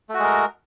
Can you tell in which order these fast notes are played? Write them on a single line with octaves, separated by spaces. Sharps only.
A3 F#4 G#3 A#4